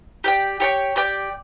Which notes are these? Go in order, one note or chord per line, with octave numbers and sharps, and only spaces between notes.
G4 D5 G5
G4 C#5 G5
G4 D5 G5